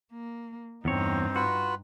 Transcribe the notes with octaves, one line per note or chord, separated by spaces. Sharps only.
A#3
E2 G2 C4 D#4 C#5
F4 F#4 B4